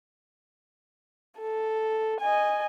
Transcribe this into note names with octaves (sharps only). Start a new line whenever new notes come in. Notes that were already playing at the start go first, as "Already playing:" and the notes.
A4
D#5 G#5